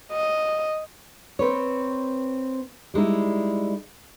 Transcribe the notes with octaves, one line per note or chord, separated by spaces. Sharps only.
D#5
C4 B4 C#5
G3 G#3 D#4 E4